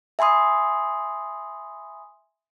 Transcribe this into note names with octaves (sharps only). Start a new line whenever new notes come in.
E5 G#5 B5 C6 D#6